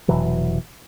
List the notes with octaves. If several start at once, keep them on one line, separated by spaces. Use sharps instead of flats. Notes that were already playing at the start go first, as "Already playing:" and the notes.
F1 B2 E3 F#3